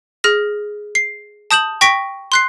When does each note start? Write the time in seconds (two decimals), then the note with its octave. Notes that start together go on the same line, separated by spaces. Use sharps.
0.24 G#4 F6 A#6
0.95 C7
1.51 A5 D#6 G6 E7 F#7
1.81 G5 C#6 A#6 B6 D7
2.32 C6 F#6 C7